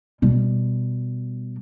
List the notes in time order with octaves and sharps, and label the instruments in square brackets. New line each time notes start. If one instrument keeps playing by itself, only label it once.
[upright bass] B2 G3